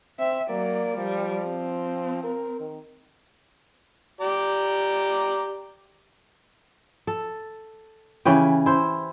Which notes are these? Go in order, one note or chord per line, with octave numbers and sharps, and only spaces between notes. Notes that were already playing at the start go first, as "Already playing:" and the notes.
C4 E5
F#3 A#3 D5
F3 G3
C4
A#4
D#3
G4 D5 A#5
A4
C#3 E3 C#4 G4
E4 C5